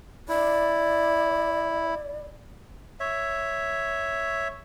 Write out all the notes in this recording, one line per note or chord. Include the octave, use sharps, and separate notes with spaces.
E4 D5
C#5 E5